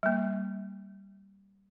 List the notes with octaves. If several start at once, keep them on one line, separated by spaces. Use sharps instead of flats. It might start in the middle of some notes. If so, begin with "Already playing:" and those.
G3 A#3